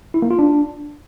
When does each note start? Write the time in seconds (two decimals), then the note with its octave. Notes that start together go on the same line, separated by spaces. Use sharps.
0.14 E4
0.22 A#3
0.31 F4
0.39 D4